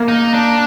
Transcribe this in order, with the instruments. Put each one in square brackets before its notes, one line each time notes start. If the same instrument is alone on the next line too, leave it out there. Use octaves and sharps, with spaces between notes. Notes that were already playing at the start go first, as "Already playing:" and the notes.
Already playing: [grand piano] A#3
[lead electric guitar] D#4
D4